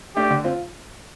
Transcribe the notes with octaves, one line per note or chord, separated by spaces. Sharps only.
A3 D4 G4
D3
C4 F4